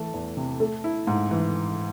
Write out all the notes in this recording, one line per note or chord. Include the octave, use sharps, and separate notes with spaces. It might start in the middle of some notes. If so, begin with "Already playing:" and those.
Already playing: E3 A3 A5
E2
C3
A3
E4
G#2
E3